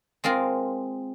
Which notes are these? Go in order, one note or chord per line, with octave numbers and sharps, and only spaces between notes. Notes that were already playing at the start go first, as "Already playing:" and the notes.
G#3 C4 F4 A#4